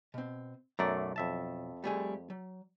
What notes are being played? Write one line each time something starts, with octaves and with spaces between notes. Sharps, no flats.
B2 C4
B1 F#2 F#3 A3 D5 A#5
F2 E5 A5
G3 A3 G#4
F#3